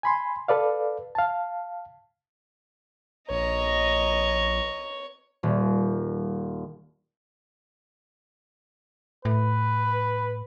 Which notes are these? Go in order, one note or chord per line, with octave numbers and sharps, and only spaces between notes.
G#5 B5 C6
A4 B4 D5 F5
F5 A5
A#1 C#5 D#5 A#5
D#1
A2 B4